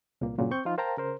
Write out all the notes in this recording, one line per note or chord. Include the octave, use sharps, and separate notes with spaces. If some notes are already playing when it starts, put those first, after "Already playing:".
C2 A#2 A#3
G2 A#2 C#3 F#3
C4 C#6 G6
F3 D#4 F4
A#4 C5 F5 G5 A5 A#5
C#3 A#4 C5